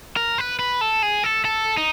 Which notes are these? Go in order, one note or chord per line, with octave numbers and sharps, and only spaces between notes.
A#4
B4
B4
A4
G#4
A4
A4
D#4